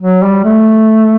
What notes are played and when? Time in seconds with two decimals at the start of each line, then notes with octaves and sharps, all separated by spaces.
0.02 F#3
0.24 G3
0.45 A3